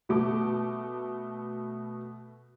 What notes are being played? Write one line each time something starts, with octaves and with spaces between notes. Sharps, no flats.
B2 A3 D6